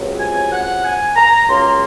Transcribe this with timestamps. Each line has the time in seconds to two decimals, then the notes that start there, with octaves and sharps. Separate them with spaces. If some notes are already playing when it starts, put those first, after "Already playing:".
Already playing: C#2 C3 F#3
0.20 G#5
0.53 F#5
0.84 G#5
1.16 A#5
1.48 C#2 C#3 F#3 A#3 C6